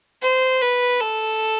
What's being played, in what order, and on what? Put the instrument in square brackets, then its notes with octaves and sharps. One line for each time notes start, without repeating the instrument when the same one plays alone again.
[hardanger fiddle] C5
B4
A4